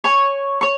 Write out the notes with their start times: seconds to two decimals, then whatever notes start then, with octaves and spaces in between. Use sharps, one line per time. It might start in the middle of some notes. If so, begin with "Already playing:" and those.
0.04 C#5 G#5 C#6
0.61 C#5 C#6